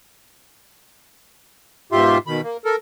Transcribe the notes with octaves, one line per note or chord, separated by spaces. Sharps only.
G#2 B2 F4 G4 E5 C6
B2 D#3 B5
A#3
A4 A#4